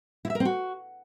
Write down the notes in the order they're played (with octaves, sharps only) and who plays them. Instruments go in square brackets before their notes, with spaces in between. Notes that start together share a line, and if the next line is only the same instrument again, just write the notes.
[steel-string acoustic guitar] E4
E5
A#4
C4
F#4